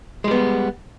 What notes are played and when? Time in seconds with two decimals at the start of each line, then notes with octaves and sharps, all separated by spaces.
0.24 G#3
0.28 G3
0.31 B3